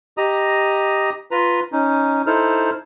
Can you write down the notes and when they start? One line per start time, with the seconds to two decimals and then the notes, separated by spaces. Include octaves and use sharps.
0.18 G4 D#5 A#5 D#6
1.31 F4 B4 A#5
1.72 C#4 D#4
2.27 D#4 E4 A4 C5 F6